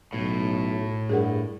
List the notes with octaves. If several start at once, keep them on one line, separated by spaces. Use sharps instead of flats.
B1 A2
G2 G#4 A#4 F#5